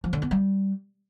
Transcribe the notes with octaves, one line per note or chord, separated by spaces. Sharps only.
F3
D3
B3
G3